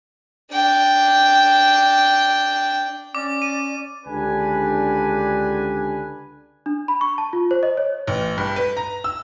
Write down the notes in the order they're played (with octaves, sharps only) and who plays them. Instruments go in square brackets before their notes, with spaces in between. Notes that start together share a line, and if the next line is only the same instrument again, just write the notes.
[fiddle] D4 G5
[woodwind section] C#4 D5 [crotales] D6
[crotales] D#7
[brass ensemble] C#2 D3 D4 G4 B4 G#5
[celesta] D4
B5
C#6
A5
F4
C5
D#5
C#5
[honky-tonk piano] A1
G2
B4
A#5
E6